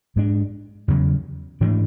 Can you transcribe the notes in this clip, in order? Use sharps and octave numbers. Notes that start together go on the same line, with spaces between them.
G#2 G#3 D4
E2 C#3 F#3
G#2 E3 A3 D4